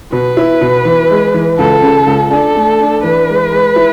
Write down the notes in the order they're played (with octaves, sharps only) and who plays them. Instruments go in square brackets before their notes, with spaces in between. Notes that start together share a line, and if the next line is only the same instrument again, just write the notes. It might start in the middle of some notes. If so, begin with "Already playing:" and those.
[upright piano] B2 [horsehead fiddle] B4
[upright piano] E4
B2
E3
G#3
E3
[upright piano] C#2 [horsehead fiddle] A4
[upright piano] C#3
C#2
[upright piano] D4 [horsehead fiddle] A4
[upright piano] A3
D4
[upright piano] E3 [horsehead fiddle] B4
[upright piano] G#3
G#3
E4